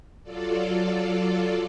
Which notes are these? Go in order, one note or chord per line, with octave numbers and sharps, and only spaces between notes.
F#3 F4 A4 D5